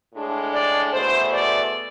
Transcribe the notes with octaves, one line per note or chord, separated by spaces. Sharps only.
A2 G#3 D4
D5
E2 B2 A3 C5
D5